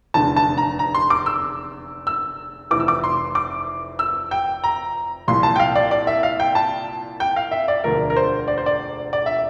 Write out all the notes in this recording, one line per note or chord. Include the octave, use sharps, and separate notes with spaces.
F1 E2 D3 A5
A5
A#5
A#5
C6
D6
E6
E6
F1 F2 E3 D6
E6
D6
C6
D6
E6
G5
A#5
C2 A#2 F3 C6
A5
G5
F5
D5
D5
E5
F5
G5
A5
G5
F5
E5
D5
E1 D2 D3 F3 A#4
A#4
C5
D5
C5
D5
D5
E5